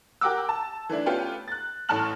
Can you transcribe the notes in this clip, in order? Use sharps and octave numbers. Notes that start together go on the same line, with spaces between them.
G4 A#4 F#5 D6 E6
A5
E3 A3 D4 E4
A3 B3 C#4 F4 G4 A4
F#6 A6
A1 A2 A4 A5 F6 F#7